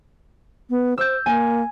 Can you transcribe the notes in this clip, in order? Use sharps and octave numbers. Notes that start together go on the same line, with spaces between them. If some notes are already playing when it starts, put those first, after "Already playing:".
B3
C5 E6 G6
A#3 G#5